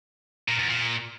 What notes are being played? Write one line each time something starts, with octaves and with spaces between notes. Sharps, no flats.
A#2
E2
A#2